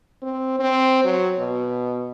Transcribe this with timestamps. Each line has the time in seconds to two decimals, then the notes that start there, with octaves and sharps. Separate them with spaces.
0.22 C4
0.59 C4
1.04 F#3
1.39 B2